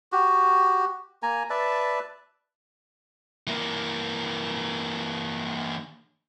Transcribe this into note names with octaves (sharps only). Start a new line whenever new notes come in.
F#4 G4
A#3 G#5 A#5
B4 D5 E5 A5
E3 A#3